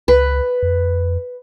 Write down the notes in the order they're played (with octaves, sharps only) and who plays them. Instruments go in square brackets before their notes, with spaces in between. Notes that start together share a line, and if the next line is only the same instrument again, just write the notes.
[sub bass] C#2 [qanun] B4
[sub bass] F2